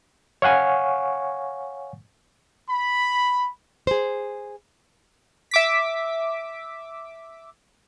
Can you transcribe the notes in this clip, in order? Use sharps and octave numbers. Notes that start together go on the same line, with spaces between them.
C#5 F5 F#5 G#5 C#6
B5
G#4 C5
E5 D6 B6